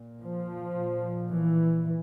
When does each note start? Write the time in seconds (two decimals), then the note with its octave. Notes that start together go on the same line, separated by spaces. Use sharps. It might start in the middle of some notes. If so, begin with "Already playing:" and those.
Already playing: A#2
0.22 F3
0.77 A#2
1.31 E3